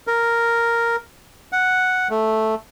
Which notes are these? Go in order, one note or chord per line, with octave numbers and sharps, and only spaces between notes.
A#4
F#5
A3